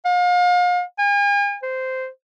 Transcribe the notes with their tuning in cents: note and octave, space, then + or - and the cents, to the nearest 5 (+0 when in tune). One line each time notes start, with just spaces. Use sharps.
F5 +40
G#5 -40
C5 -10